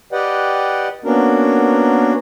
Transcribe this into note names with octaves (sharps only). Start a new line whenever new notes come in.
G4 B4 D5 D#5 F#5 G5
A#3 B3 C#4 D4 F#4 A#4